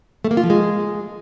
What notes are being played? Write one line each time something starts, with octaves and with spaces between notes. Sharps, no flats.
A3
A#3
F4
F3
G#3